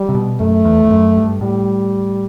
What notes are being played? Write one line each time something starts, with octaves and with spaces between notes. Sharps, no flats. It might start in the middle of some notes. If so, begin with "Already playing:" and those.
Already playing: G3
C3
B2
F#2 A3
E2
E2
F#2
G2
A2 G3